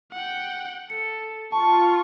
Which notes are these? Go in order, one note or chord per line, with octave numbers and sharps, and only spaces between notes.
F#5 G5
A4 C#7
F4 A5 C#6